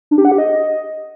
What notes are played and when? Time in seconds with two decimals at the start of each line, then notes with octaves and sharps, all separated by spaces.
0.11 D4
0.18 G4
0.25 F#5
0.32 G4
0.38 D#5